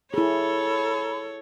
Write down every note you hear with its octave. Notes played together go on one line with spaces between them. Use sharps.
E4 G#4 A4 C#5 B5